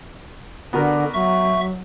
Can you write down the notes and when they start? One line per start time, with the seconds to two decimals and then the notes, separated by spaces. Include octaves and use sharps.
0.73 D3 B3 F#4 A#4
1.14 F#3 E5 C#6